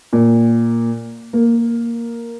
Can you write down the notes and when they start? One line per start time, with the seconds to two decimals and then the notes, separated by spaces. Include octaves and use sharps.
0.13 A#2
1.33 A#3